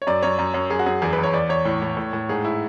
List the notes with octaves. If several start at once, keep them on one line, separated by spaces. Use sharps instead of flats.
C#5
F#2 D5
F#2 C#5
F#2
F#2
F#2 G#4
F#4
F#2 G#4
E2 G#4
B4
E2 C#5
E2 D5
E2 C#5
A2
A2
A2
A2
G#2 G#4
E4